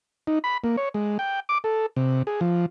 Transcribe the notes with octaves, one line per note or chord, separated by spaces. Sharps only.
D#4
B5
A#3
C#5
G#3
G5
D6
A4
C3
G#4
F3